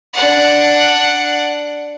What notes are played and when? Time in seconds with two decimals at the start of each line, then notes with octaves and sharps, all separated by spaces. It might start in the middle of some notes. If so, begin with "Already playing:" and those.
0.13 D4 F#5